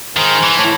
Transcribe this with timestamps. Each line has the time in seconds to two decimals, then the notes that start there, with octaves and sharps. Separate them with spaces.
0.16 G#2 D#3
0.43 E3
0.58 A2